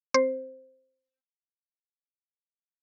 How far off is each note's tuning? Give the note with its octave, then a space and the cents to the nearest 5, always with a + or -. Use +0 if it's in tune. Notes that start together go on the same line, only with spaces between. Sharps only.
C4 +0 C5 +0